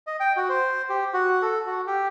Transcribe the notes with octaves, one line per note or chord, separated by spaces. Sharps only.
D#5
G5
F#4
C5
G4
F#4
A4
F#4
G4